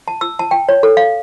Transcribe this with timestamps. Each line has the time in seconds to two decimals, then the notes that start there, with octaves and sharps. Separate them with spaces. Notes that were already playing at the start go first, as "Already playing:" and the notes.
0.08 A5
0.21 E6
0.39 A5
0.51 G5
0.69 C#5
0.83 A4
0.97 F5